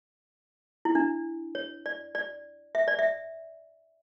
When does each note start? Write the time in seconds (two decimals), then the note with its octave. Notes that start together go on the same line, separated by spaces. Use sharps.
0.85 E4
0.95 D4
1.55 C#5
1.86 D5
2.15 D5
2.75 E5
2.88 D5
2.99 E5